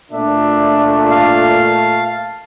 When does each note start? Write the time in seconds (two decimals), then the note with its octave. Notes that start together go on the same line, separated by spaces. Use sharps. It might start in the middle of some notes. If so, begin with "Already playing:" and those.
0.12 A#2 A3 D4 E5
1.11 F5 A5